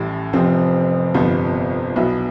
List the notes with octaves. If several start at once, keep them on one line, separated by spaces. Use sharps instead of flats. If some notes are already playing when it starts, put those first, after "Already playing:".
Already playing: A1 A2 G3
F1 F2 C3 F3 C4
G1 F2 C3 F3 B3
B1 B2 B3 E4